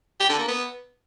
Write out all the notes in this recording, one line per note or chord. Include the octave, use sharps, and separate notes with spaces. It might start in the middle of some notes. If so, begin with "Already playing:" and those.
G4
D3
A#3
B3